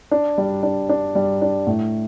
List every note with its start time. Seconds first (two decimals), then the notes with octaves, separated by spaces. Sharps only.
0.11 D4
0.38 G3
0.63 D4
0.89 D4
1.15 G3
1.42 D4
1.67 A2